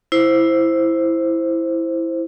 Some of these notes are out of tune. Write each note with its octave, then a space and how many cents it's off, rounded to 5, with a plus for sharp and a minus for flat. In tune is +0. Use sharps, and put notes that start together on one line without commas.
E4 +0 C5 +0